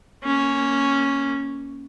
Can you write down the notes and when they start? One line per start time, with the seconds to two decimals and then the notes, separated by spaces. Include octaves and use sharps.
0.24 A#3 C#4